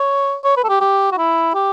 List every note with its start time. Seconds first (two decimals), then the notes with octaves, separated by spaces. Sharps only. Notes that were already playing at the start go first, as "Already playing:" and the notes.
Already playing: C#5
0.44 C#5
0.57 B4
0.64 A4
0.69 G4
0.81 G4
1.12 F#4
1.18 E4
1.54 G4